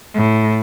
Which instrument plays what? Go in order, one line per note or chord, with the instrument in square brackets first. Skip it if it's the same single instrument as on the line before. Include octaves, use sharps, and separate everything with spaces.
[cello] A2